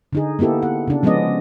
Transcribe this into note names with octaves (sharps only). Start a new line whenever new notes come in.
D3 D#4 G#4
A#3 B3 E4 G4 A4
F#5
C#3 D4
F3 G#3 B3 C#4 D5 D#5